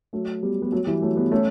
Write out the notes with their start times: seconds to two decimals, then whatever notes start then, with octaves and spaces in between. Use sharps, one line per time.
0.13 F#3 A3
0.43 G3 B3
0.62 G3 B3
0.72 F#3 A3
0.87 E3 G3
1.02 F#3 A3
1.16 G3 B3
1.31 A3 C#4